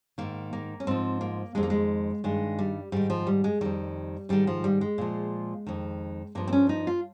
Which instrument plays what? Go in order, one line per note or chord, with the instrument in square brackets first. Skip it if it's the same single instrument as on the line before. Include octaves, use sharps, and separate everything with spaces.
[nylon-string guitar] G#2 D#3 A#3
A#3
C#4
G#2 F3 C4
A#3
F2 D#3 G#3
A#3
G#3
G2 D#3 G#3
G3
G#2 D#3 G3
F3
G3
G#3
F2 D#3 G3
G#2 D#3 G3
F3
G3
G#3
A#2 F3
F2 D#3
G2 F3 A#3
C4
C#4
D#4
F4